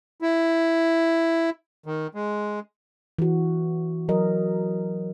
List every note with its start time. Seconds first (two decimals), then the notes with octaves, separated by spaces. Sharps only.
0.22 E4
1.86 D#3
2.15 G#3
3.19 E3 F#4
4.09 F#3 A#4 D#5